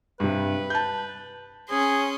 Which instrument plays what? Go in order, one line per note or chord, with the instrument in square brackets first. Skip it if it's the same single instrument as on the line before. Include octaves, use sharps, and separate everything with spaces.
[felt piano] G2 C3 [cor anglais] B4
[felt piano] A5 G6
[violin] C#4 C6 [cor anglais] G#4